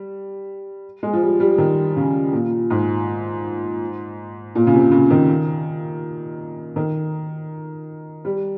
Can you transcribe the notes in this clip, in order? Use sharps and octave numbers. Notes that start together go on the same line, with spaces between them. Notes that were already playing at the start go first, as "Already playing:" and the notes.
Already playing: G3
G#3
F3
G3
G3
D#3
C#3
A#2
G#2
A#2
C#3
C3
C#3
D#3
D#3
G3